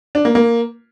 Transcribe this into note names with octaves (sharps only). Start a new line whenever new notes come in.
D4
A#3
A#3